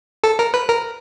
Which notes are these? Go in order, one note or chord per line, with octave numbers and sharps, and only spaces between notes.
A4
A#4
B4
A#4